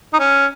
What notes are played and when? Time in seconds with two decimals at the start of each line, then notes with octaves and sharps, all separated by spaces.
0.13 D#4
0.19 C#4